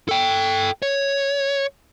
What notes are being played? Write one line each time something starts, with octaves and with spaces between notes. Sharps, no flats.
A4 G5
C#5